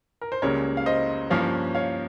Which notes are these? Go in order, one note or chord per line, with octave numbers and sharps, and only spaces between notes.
A#4
C5
C#2 C#3 G3 A#3 A#4 C#5
F5
C5 D#5
G2 F3 A#3 C#4 C#5 F5
C#5 F5